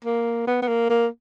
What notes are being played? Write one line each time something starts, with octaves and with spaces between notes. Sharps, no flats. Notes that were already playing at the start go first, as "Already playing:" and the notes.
A#3
B3
B3
A#3
A#3